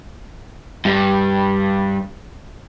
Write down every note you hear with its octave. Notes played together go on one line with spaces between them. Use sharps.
G2 G3